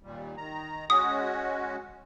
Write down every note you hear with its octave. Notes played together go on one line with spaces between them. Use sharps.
D#2 A#2 G3
D#3 A#5
G#3 C#4 F#4 D#6